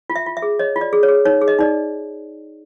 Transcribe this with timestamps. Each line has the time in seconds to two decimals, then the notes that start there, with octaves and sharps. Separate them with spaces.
0.10 F4
0.16 E5
0.26 F4
0.37 E5
0.42 G#4
0.59 C#5 D#5
0.76 F4
0.81 D5
0.93 G#4
1.03 C#5
1.08 G#4
1.25 D#4 C#5
1.42 G#4
1.48 D#5
1.59 D#4 D5